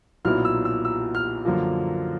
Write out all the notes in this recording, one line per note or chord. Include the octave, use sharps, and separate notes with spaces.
B1 A#2 F#3 B3 E4 F6
E6
E6
E6
F6
F#2 D3 F3 A#3